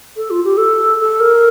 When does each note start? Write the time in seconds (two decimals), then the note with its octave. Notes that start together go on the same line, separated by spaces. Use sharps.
0.17 A4
0.30 F4
0.44 G4
0.57 A4
0.99 A4
1.20 A#4